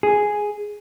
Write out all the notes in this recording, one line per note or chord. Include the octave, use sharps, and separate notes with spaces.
G#4